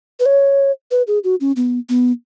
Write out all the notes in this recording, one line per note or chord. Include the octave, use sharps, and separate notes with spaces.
B4
C#5
B4
G#4
F#4
C#4
B3
B3